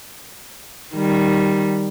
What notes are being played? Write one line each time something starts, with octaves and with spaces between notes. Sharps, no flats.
D#3 G3